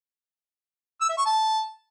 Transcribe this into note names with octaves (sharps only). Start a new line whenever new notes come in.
E6
E5
C#6
A5